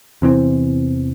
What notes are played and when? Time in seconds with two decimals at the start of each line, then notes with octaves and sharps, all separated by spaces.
0.22 E2 C3 E3 C4